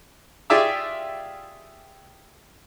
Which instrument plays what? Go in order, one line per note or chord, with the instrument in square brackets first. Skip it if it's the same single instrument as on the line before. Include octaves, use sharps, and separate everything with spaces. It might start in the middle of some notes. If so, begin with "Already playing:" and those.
[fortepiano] F4 G4 G#4 D5 E5 D6